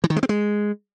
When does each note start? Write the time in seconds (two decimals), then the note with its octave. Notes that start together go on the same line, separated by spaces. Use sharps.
0.04 E3
0.10 D#3
0.16 G#3
0.23 C4
0.29 G#3